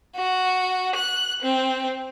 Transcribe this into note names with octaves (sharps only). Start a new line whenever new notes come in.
F#4
F#6
C4